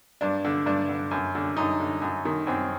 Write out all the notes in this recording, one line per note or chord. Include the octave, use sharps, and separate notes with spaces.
G2 D4
D3
G2 D4
D3
F#2
D3
F#2 D#4
D3
F#2
D#3
F#2 C4